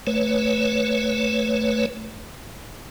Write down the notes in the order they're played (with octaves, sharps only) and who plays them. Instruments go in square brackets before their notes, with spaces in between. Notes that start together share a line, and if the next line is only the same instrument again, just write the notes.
[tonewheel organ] A3 B4 C#5